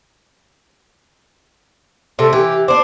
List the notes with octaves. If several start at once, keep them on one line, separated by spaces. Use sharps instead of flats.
C3 A3 A4
E3 G4
D4 C5 D6